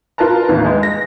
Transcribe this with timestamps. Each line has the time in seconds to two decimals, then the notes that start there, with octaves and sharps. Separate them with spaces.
0.18 F4 A#4 B4 A5 A#5
0.47 A1 D#2 B4
0.65 G#3
0.83 A#6